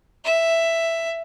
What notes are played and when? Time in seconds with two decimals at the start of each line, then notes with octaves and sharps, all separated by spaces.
0.24 E5